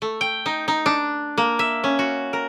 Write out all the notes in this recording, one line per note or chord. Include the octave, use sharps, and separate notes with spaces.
A3
G5
D#4
D#4
D4
A#3
E5
C#4
F#4
A#4